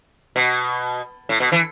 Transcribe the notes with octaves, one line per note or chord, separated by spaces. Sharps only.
B2
A2
B2
E3